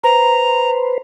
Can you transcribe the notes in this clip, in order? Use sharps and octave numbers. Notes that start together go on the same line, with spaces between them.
B4 C5 A#5